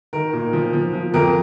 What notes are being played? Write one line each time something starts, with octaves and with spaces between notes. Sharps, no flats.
D#3 A#4
A#2
F3
F3
F3
F2 A#4